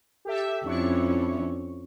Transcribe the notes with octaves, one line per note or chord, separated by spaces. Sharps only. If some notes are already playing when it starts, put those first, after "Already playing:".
G4 A4 E5
F2 C#4 D4 E4 C#6